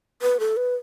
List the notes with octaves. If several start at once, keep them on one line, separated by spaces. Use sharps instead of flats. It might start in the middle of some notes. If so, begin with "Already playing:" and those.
B4
A4
B4